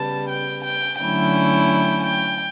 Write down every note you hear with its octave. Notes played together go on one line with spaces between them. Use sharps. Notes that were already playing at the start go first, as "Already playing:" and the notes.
Already playing: C#3 G3 B3 A5
G5
G5
D3 F#3 A3 C#4 E4 G5
G5